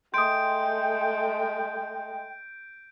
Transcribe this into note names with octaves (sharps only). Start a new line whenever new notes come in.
G#3 A3 G5 C6 D#6 G6 D7